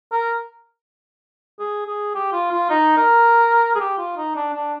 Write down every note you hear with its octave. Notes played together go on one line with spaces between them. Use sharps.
A#4
G#4
G#4
G4
F4
F4
D#4
A#4
G#4
G4
F4
D#4
D4
D4